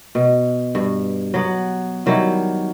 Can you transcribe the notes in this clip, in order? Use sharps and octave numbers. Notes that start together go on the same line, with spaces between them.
B2
G2
F#3 B3
D#3 F#3 G3 E4